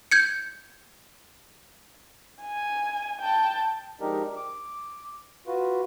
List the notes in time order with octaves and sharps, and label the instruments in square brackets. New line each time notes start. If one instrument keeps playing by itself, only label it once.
[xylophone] G6 G#6 C#7
[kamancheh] G#5
G5 A5
[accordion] F3 G#3 D4 D#4 G4 A#4
D6
F4 F#4 B4